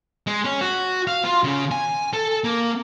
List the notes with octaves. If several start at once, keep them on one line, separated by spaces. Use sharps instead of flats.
G#3
C#4
F#4
F5
F4
C#3
G#5
A4
A#3